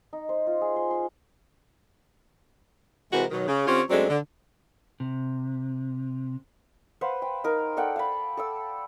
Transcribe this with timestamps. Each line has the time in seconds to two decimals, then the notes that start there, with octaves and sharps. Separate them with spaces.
0.13 D#4
0.29 C5
0.47 F4
0.61 G#4
0.76 C6
0.91 C6
3.13 C3 E3 G#3 F#4 A#4 C5
3.31 B2 D#3 F#3
3.47 C#3
3.67 D3 C4 C#4 F4 G4 C#5
3.90 F#2 F#3 G#3 A3 C4 D4
4.09 D3
5.00 C3
7.01 B4 C5 F5 F#5
7.22 G5
7.44 D#4 A#4
7.77 A4 D5 F#5 G5
7.96 F5 A5 B5
8.37 A4 D6 E6